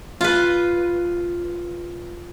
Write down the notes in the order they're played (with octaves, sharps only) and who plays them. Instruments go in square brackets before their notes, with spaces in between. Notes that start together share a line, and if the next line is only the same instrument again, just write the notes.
[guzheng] F4 B4